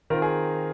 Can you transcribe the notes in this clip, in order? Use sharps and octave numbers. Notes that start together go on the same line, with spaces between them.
D#3 C4 F4 A#4
G#4